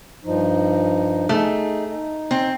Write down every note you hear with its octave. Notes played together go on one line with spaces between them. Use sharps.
G2 F3 D#4
A3 D#4 G#4
D#4
C4